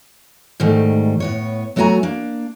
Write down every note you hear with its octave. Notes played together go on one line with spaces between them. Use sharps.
G#2 D#3 G3 A3
A2 B3 C#5
F#3 A3 B3 F#4 G#5 A#5
A#3 D4